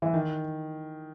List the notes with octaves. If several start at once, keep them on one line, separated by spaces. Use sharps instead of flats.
E3
D#3